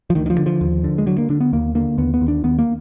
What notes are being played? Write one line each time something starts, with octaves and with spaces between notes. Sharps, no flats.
F3
D2 D#3
D#3
F3
D3
F3
D#2
D3
G#3
D3 F#3
A#3
D3 D4
B3
D#2 A#3
D3 A#3
D#2 B3
B3
D#2
D4
D#2 B3
A#3